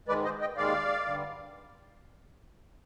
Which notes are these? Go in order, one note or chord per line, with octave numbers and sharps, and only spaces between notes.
G#2 D#3 G#3 B4 D5
C5 D#5
D#5 G5
D#2 D#3 G#3 D5 F5
G2 D3 G3